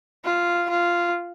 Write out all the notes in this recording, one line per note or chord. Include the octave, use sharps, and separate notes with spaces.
F4
F4